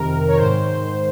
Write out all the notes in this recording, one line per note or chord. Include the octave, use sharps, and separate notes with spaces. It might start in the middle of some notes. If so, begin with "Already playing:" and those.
Already playing: F2 C3 D#3 A#4
C#5
G#2 D#3 C5